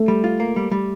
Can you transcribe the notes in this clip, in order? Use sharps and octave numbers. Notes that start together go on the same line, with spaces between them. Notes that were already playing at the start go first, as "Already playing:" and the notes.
Already playing: A3
G3
F4
A#3
G3
G3